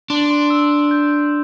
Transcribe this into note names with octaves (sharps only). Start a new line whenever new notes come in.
D4 C6
C6
E6
G6